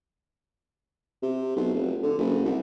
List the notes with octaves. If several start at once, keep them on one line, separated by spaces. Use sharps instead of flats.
C3
B1
F1
D3
F#1
C2